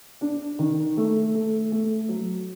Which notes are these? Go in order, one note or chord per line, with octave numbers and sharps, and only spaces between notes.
D4
D#3
A3
A3
A3
F#3